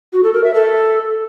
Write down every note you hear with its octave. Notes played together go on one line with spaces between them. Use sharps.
F#4
A4
A#4
E5
A4